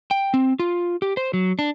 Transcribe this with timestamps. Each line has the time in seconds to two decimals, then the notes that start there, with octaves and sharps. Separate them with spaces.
0.11 G5
0.34 C4
0.59 F4
1.02 G4
1.17 C5
1.34 F#3
1.59 D4